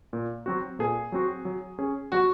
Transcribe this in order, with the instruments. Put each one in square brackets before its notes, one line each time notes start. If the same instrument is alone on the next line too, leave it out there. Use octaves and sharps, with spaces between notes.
[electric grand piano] A#2
F#3 C4 F#4
[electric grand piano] A#2 [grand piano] G#4
[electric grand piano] F#3 C4 F#4
F#3
C#4 G#4
[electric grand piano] F#3 [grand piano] F#4